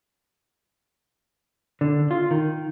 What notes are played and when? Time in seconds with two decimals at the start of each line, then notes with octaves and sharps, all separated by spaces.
1.81 D3
2.11 F4
2.31 D#3